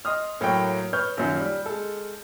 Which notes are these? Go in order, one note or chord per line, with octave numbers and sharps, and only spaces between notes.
D#5 C6 D#6 F6
A2 F#3 A#3 G5 C#6
B4 C#5 F6 G6
A#1 F#2 D#3
G3
G#3 A4